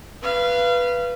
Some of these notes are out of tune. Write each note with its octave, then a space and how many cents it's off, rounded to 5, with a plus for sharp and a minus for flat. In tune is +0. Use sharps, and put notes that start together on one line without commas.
B4 -5 F5 -30